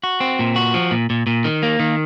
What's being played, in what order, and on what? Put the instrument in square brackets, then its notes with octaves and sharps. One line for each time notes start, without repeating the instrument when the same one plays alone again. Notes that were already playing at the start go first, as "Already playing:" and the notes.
[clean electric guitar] F#4
C4
A#2
F#4
F3
A#2
A#2
A#2
D#3
A#3
D#3